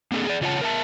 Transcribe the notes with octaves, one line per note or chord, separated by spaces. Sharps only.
A#3 C4 D4 G#4 A4
G#4 D5
C#3 F4 C#5 D5 F#5 A5
A#4 E5 A5